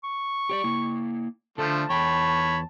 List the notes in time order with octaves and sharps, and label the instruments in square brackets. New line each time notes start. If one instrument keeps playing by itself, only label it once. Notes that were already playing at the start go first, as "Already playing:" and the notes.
[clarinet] C#6
[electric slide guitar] G4 C#5 D5
A#3 E4
[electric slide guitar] D3 A4 [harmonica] F3 A3 [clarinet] A5
[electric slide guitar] E2 G5 [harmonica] C#5 B5